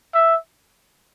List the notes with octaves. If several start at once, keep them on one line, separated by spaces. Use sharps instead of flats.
E5